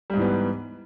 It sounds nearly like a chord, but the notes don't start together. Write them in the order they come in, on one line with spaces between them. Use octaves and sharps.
G3 G#2 E3 B3